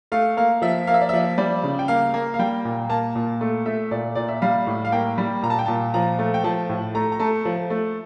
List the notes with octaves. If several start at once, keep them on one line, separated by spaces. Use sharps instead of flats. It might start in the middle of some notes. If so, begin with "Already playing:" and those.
A3 F5
A#3 F5
F3 E5
A#3 F5
E5
D5
F3 E5
G3 D5
C#3
G5
A#3 F5
A#3
F5
G3 G5
A#2
A#3 A5
A#2
A3
A3 E5
A#2 D5
A#2 D5
E5
G3 F5
A2
F5
A#3 G5
G3
A#2 A#5
A5
G5
A#2 A5
F3 A#5
A3
G5
F3 A5
A2
A3 A#5
A#5
A3 A5
F3
A3